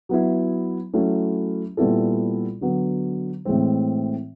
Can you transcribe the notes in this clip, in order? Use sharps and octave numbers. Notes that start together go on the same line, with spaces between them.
F#3 B3 E4
F#3 A3 C#4 E4
A#2 G3 B3 E4 A4
D3 F#3 B3
A2 E3 G#3 C4